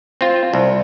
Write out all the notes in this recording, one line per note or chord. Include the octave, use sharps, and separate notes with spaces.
C4 F4
C2